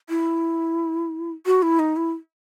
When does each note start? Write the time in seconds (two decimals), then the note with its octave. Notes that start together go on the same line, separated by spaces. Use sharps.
0.09 E4
1.46 F#4
1.62 E4
1.79 D#4
1.96 E4